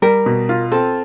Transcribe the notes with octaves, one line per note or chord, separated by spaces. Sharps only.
G3 A#4
B2
F4
C4 A4